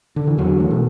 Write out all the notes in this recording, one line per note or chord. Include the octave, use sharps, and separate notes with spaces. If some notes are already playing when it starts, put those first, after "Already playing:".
D3
E3
E2 D3 F#3
E3 A3
B2